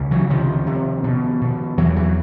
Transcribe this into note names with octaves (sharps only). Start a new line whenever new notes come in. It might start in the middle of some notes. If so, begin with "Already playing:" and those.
Already playing: C#2 C3
E3 F#3
C3 D#3 F3
C3
B2
B2
E2 E3 F#3
E3 F#3